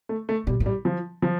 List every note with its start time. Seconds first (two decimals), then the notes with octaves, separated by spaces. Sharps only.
0.09 A3
0.29 A3
0.47 B2 G3
0.60 A2
0.66 G3
0.85 F3
1.22 F3